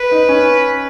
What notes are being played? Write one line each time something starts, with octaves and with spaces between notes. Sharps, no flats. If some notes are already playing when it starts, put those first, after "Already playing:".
Already playing: B4
D#4
C#4